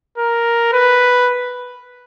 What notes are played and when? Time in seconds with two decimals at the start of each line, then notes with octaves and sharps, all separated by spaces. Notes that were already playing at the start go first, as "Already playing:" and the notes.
0.18 A#4
0.73 B4